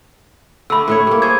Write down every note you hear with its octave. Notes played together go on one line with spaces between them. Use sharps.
D3 A3 B5 E6
A2 A3 C#5
G3 A#3
G#4 C5 C#5 G#6